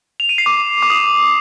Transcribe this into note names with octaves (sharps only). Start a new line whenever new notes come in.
F7
D#7
C7
D6
D6
D#6